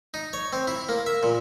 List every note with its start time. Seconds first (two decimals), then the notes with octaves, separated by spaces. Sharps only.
0.14 D#4
0.33 C#5
0.53 C4
0.67 E4
0.89 A#3
1.06 E5
1.23 A#2